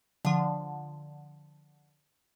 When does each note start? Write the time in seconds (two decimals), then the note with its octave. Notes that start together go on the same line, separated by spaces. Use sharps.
0.25 D3 F3